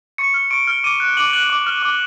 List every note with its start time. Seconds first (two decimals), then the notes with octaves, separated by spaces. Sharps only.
0.18 C#6 C#7
0.34 F6
0.51 C#6 D7
0.67 F6
0.84 D6 D#7
1.00 F#6
1.17 D6 F#7
1.33 F#6 F#7
1.50 D6
1.67 F6
1.82 D6